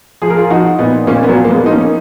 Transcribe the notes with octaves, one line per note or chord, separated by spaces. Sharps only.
F3 G#4
A#4
F4 G#4
F3 D#4 F#4
A#2 B3 D#4
A#2 A#3 C#4
B3
F#3 A#3
F3
A#3
G#3 B3
F3 D#4
A#3 C#4